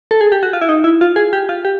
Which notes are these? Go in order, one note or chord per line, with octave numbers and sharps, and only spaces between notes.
A4
G#4
G4
F#4
F4
E4
D#4
E4
F4
G#4
G4
F4
G4